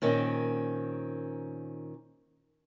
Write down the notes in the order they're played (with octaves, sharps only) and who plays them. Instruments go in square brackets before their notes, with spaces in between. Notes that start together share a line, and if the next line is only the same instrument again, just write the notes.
[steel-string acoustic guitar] A#2 D#3 C4 C#4